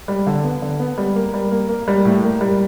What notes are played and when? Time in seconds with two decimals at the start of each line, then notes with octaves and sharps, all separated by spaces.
0.08 G3
0.27 D3
0.44 B3
0.62 D3
0.80 B3
0.98 G3
1.16 A#3
1.34 G3
1.51 A#3
1.69 A#3
1.88 G3
2.05 A2
2.24 A#3
2.41 G3